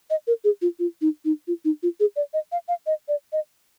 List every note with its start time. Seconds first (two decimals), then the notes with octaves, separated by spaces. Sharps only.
0.10 D#5
0.27 A#4
0.44 G#4
0.62 F4
0.79 F4
1.01 D#4
1.25 D#4
1.48 F4
1.65 D#4
1.83 F4
2.00 G#4
2.16 D5
2.33 D#5
2.52 F5
2.68 F5
2.86 D#5
3.08 D5
3.32 D#5